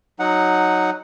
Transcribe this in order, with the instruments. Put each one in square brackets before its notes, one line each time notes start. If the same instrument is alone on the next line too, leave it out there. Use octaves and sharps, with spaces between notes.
[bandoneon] F#3 D#4 F#5